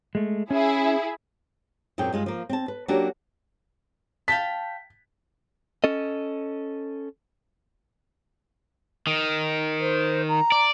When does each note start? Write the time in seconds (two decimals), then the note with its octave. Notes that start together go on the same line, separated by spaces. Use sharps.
0.15 G#3 A3
0.50 C#4 E4 G#4
1.98 F#2 A#2 C4 G#4 G5
2.13 G2 G#3 F4
2.26 F3 A#3
2.49 C4 A5
2.68 B4
2.88 F#3 A#3 C#4 D4 F#4 G4
4.28 F5 G5 A5 B6
5.84 C#4 A4 D#5
9.07 D#3
9.80 C5
10.29 A#5
10.52 D5